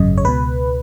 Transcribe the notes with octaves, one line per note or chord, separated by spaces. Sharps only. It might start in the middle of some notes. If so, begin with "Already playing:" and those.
Already playing: G#1 F#2 C#3 D#5
C#5
C#2 B2 B4